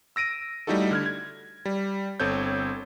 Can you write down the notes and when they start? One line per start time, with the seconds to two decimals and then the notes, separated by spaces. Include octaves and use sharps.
0.16 E6 A#6 D7 D#7
0.67 G3 A3 D#4 E4 F#4 A4
0.91 D3 F6 G#6
1.06 G#6
1.65 G3
2.20 G1 C4 A4 C#5 G6